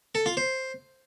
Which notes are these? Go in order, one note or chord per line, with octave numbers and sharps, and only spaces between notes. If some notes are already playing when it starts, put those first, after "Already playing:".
A4
F4
C5